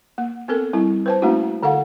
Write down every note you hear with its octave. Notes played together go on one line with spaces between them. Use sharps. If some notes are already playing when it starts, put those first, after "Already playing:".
A#3
B3 C4 A4 A#4
G3 C4 E4
B4 C5 A5
A3 A#3 C#4 D4 E4 F#4
D3 A4 F5 F#5